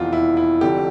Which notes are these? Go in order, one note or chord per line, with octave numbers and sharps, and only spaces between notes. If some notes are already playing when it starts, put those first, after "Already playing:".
Already playing: F1 E2 E3 F4
E4
E4
F1 F2 D3 F3 G4